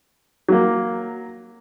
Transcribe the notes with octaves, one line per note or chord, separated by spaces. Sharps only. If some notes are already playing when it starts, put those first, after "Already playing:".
F#3 A#3